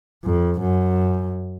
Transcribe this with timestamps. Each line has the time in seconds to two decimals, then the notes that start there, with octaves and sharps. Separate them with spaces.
0.25 F2
0.61 F#2